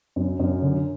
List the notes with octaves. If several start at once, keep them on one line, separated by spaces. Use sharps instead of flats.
F#2
F#2
D3